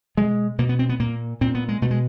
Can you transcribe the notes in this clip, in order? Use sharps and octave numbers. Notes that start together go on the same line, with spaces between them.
B2 G#3
B2 A#3
B3
C4
B3
A#2 A#3
A#2 C4
B3
G#3
B2 A3
G#3